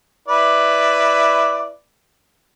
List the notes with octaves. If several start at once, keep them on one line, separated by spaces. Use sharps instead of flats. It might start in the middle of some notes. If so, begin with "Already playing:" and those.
E4 B4 D5